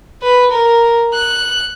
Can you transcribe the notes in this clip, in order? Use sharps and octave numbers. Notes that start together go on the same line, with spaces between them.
B4
A#4
F#6